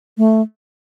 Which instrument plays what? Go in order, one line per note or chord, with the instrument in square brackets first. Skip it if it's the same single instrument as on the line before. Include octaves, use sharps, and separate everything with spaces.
[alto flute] A3